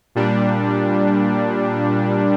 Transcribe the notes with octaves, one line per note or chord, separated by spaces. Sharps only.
A#2 G3 D4